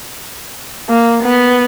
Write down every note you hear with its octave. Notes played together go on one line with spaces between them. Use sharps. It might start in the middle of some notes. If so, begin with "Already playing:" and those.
A#3
B3